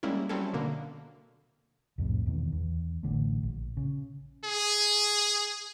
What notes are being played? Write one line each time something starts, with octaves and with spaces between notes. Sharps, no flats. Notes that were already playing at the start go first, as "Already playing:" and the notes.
G3 G#3 A#3 C#4 E4
F#3 G3 C4 C#4 E4 A4
B2 D3 A#3
C2 F2 A2 C3
E2 B2 D#3
E2
A1 D3 A3
A#1
C#3
G#4